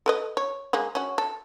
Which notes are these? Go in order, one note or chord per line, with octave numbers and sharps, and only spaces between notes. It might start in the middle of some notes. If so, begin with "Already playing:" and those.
A4 B4 D#5
C#5
G#3 A#3 G#4
C#4 F#4
A4